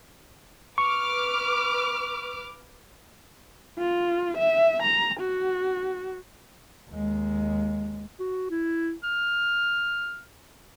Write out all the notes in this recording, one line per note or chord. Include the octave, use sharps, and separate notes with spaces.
B4 C#6 D6 F6
F4
E5
A#5
F#4
D#2 G#3
F#4
E4
F6